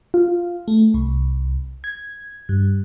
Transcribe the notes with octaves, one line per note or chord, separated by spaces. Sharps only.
F4
A3
C2
G#6
G2